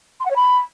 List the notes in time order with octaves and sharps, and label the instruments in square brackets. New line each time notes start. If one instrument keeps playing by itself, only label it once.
[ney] C6
F#5
C#5
B5